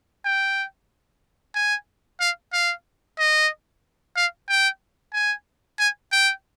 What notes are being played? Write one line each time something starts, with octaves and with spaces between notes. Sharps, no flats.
G5
G#5
F5
F5
D#5
F5
G5
G#5
G#5
G5